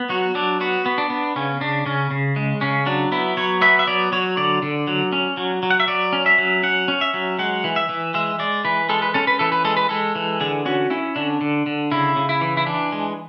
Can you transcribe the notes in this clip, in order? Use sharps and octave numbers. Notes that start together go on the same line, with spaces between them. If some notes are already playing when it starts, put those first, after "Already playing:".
Already playing: B3
F#3 F#4
F#3 D4
B3 F#4
B3
D4
B3
C#3 C#4
C#3 D4
C#3 C#4
C#3
G#3
C#3 C#4
F#3 D4
B3 E4
F#3 C#5
B3 E5
E5
F#3 D5
F#3 C#5
D3 D5
D3
F#3
C#4
F#3
F#3
F#5
E5
F#3 D5
C#4
E5
F#3
C#4 F#5
C#4
E5
F#3
G#3 F#5
E3
E5
E3
G#3 E5
G#3 D5
E3 B4
G#3 A4
B4
C#4 A4
B4
E3 A4
B4
G#3 A4
B4
G#3 A4
E3
D3 G#4
C#4 F#4
C#4 E4
D3 D4
D3
D3
C#3 E4
C#3
E4
E3
E4
E3 D4
G#3